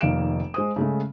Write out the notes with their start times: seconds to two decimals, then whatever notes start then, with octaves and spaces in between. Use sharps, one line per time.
0.01 F1 D#3 A#3 F5 D7 E7
0.54 G#3 C5 D#6
0.76 C#3 G#3 A3